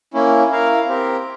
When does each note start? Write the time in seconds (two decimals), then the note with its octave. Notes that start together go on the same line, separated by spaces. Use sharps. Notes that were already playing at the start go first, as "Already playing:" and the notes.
0.14 A#3 C#4 E4
0.50 E4 A#4 F5
0.87 C4 G4 A#4